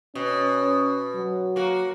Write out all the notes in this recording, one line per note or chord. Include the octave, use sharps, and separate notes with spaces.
B2 C#4
F#3
A#3 F#4